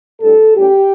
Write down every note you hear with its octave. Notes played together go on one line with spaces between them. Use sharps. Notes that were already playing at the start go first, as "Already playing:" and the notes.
A2 G3 D4 A4
A2 G3 C#4 G4